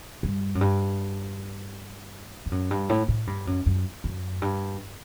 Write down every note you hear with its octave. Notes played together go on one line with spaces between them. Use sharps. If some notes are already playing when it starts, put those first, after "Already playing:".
G2
F#2
G2
G2
F#2
G2
A2
A2
G2
F#2
F#2
F#2
G2